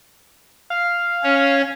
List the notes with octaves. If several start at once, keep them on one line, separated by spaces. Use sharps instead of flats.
F5
C#4 C#5